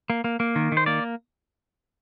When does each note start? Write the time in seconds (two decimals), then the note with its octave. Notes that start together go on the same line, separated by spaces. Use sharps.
0.10 A#3
0.24 A#3
0.40 A#3
0.56 D#3
0.72 D#3
0.77 C5
0.86 A#3 D5